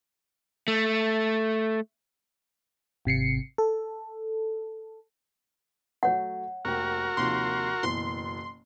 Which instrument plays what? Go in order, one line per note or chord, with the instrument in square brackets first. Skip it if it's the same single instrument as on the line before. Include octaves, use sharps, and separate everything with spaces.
[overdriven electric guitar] A3
[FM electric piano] G#1 C3 C7 C#7
A4
[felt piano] F#3 A3 [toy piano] C#5 F#5
[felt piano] F1 A#3 G5 [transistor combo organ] F#4 A#4
[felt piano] D#2 C3 F3 [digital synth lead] C6
[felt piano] F#1 B2 E3 [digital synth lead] C6